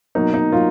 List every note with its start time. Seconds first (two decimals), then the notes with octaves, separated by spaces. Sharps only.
0.15 B2 F#3 A#3 D#4
0.34 D#4
0.52 F#3 A#3 F4